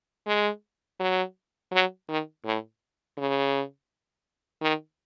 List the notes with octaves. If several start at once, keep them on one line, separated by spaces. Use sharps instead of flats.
G#3
F#3
F#3
D#3
A2
C#3
D#3